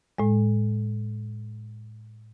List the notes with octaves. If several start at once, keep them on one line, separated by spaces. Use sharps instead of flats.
A2 G#3